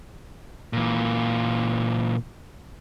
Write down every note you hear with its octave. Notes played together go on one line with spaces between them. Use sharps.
A#2 E3